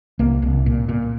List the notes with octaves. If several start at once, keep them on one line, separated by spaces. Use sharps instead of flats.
C2 A#3
C2
A#2
A#2